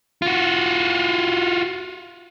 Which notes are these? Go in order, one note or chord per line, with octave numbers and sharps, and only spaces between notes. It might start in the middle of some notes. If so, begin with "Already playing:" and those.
F4 F#4